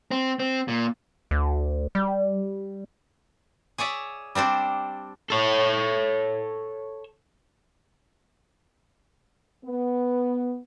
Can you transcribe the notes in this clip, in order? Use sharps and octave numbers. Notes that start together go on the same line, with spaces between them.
C4
C4
A#2
D2
G3
G#4 C#5 D5 E5
G3 C4 D4 C5
A4 C#5
B3